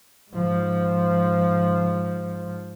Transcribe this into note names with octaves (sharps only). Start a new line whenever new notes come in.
G#2 F3